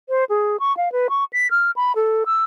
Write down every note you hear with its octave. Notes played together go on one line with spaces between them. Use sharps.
C5
G#4
C#6
F5
B4
C#6
B6
F6
B5
A4
E6